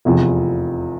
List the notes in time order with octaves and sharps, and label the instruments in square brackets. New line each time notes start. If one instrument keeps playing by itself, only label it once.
[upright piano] F1 E2 C3 F3